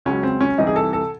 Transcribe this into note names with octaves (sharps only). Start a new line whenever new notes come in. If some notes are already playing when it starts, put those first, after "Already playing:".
C#2 C#3 F#3 C#4
C4
C#4
C2 C3 E3 D#4
G#4
A4
A4